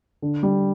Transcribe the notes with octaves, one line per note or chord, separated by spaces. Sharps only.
D3
G3